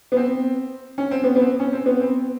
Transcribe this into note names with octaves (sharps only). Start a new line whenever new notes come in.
B3
C4
C#4
C4
B3
B3
C4
C#4
C4
B3
C4